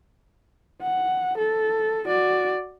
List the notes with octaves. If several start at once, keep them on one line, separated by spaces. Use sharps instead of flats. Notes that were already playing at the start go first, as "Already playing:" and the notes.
F#5
A4
F#4 D5